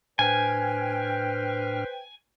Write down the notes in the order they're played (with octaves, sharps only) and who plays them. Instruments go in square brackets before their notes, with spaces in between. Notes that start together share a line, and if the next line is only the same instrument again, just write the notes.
[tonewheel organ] A2 D4 F6 [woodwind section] B4 C5 G5 [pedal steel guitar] G#5